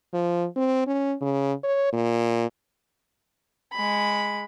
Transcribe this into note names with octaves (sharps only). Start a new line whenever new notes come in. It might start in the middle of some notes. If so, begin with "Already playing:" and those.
F3
C4
C#4
C#3
C#5
A#2
G#3 B5